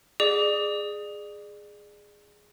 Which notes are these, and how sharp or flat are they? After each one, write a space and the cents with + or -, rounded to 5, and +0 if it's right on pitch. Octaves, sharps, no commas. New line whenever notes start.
G#4 +0 D5 +30 D6 -20